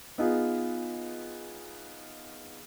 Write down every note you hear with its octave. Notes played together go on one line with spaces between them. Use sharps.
B3 D#4 F4 G#4